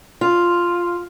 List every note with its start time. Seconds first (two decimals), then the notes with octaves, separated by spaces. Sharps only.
0.21 F4